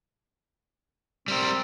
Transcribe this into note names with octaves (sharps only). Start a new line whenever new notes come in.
G3 C4 A#4